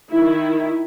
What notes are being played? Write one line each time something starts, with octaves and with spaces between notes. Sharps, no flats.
D#3 E4